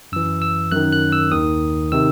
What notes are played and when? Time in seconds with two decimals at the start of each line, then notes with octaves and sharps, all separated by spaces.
0.12 F#2 E3 E6
0.42 E6
0.72 F#2 D#3 F#6
0.93 F#6
1.12 E6
1.32 D#2 D#3 D#6
1.92 C3 D#3 E6